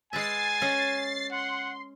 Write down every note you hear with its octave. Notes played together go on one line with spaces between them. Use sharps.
G#3 B4 E5 G#5 A6 C7
C#4 D#5
F#5 C6